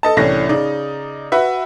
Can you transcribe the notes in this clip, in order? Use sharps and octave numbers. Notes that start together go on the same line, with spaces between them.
A4 D#5 A5
C2 A2 E3 C#4 D4 A#6
C#3 D#4 D5
F#4 B4 E5